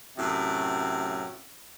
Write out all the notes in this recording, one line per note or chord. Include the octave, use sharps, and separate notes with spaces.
F#2 A2 C3